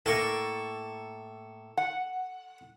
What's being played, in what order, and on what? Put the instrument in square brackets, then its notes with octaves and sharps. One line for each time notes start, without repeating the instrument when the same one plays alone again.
[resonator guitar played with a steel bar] A2 A#3 [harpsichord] A4 C#6
[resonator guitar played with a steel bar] F#5